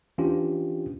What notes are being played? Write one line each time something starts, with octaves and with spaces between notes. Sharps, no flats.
E3 C#4 D4 F4 G4